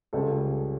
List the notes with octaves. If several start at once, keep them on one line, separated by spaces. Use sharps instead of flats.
C#2 C#3 G3 C#4 A4